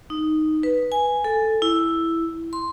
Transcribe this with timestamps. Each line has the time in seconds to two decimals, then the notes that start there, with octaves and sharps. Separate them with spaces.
0.10 D#4
0.63 B4
0.92 G#5
1.24 A4
1.62 E4
2.53 C6